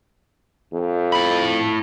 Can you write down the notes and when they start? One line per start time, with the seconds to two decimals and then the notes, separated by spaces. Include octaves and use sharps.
0.73 F2
1.12 A2 B5